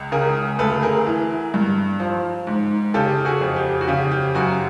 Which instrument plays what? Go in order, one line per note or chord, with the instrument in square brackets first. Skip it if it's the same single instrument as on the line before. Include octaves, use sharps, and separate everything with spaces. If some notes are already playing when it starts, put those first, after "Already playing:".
Already playing: [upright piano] C#2
C#3 G#4 A#4
D2 A4 B4
G#4 A#4
E3
G2
F3
G#2
C#3 G4 A4
F#4 G#4
F2
G4
F#4
C#3 G4
G4
F#2 F#4